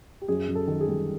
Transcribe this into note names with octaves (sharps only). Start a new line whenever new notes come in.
G4
F#2 G#4
F#2
A4
D#3
G#4
G3